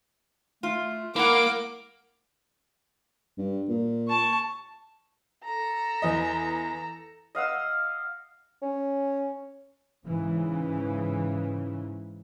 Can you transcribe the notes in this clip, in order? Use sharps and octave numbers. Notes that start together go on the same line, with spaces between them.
A3 F4
A#3 E4 A#4 F#5 D6
G2
A#2
A5 C#6
A4 A#5
E2 D#5
D#5 F5 F#5 E6
C#4
G#2 C#3 E3